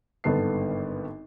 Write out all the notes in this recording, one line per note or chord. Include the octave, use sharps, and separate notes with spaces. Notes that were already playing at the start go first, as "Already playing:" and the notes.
G#1 G2 D3 B3 A5 C7